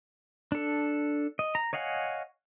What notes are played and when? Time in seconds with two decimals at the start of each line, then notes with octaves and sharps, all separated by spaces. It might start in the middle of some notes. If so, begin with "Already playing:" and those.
0.52 D4 A4
1.39 D#5
1.55 A#5
1.73 C#5 D#5 F5 F#5 G#5